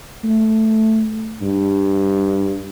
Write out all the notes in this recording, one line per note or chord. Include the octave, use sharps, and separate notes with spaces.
A3
G2